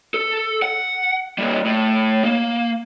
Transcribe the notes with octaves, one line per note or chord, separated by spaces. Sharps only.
A4
F#5
G3 A#3
A2
A#3